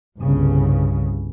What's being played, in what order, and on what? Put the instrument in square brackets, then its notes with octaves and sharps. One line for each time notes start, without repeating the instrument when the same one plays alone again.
[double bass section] G1 C2 G2 C#3